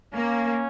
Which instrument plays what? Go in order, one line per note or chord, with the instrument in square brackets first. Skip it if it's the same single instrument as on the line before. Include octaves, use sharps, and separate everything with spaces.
[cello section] A#3 [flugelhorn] C#4